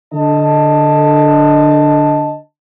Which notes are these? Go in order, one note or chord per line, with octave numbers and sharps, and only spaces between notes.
D3 D#5 A5